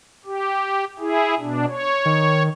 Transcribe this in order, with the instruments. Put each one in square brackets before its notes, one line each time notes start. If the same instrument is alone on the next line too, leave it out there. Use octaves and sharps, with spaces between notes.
[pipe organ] G4
E4 G#4
B2 D4
C#5
[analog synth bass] D#3